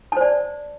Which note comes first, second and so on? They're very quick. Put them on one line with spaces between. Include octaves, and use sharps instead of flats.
A5 C5 D5